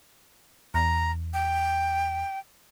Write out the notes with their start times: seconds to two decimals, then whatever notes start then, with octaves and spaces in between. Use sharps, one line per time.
0.74 E2 A#5
1.34 G5